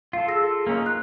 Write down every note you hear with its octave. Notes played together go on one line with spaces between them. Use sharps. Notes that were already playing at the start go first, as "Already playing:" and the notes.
F4 A4 F5
G#4 E6 A#6
A#3 C#4 D#4
F4 F#6